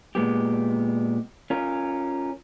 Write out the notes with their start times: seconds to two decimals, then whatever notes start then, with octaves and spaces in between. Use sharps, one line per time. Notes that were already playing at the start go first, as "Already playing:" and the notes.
0.15 A#2 G#3 B3 G4
1.50 C#4 F4 A#4